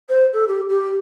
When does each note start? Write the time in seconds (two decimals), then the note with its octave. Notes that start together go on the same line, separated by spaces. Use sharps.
0.09 C5
0.33 A4
0.48 G4
0.69 G4